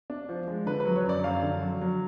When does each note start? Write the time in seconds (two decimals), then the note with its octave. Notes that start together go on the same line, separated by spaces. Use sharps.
0.10 D4
0.29 F3
0.48 G#3
0.66 D3 B4
0.80 B4
0.85 F#3
0.96 C#5
1.04 F#2 D5
1.24 F#2 F5
1.43 D3
1.62 F#3
1.81 F#3